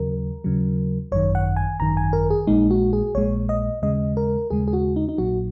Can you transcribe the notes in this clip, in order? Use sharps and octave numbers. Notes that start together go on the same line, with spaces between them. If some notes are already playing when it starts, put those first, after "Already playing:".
Already playing: D#2 C#3 F#3 A#4
D#2 C#3 F#3
G#1 F#2 D#3 C#5
F#5
G#5
G#1 F#2 D#3 A#5
G#5
A#4
G#4
A#1 A#2 G#3 D#4
F#4
G#4
A#1 A#2 G#3 C#5
D#5
D#2 C#3 G#3 D#5
A#4
D#2 C#3 G#3 G#4
G#4
F#4
D#4
D#4
A#1 A#2 F#3 F#4